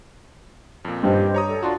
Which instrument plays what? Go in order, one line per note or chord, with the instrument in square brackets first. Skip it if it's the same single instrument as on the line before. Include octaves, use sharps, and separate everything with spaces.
[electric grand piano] F2 A#2
[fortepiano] G2 [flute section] G4 C5 D#5
[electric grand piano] C#5 A#5 D#6
[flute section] A4 D5
[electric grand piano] D4 F4 F#4 [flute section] D5 A5 C6